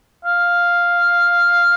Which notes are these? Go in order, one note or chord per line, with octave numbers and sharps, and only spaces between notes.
F5